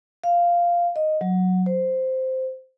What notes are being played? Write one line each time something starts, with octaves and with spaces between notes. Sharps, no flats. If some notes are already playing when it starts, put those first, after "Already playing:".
F5
D#5
F#3
C5